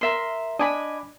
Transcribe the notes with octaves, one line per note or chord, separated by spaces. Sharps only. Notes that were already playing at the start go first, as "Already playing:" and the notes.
A#4 E5 C6
D4 D#5 G#5 B5 D6